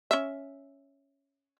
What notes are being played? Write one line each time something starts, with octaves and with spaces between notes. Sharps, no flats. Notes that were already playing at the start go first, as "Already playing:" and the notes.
C#4 E5